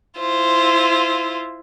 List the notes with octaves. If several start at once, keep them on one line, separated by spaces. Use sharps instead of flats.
E4 F4 C5